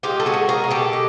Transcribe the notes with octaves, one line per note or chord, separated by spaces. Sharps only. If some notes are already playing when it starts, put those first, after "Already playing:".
G#3 F4 G4
A4
F#4 G#4
B2
G#4 A#4
B2
G4 A4
G#3